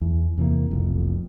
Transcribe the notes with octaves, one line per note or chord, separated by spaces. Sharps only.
E2
E2 C3 E3 A#3
F1 B1 F2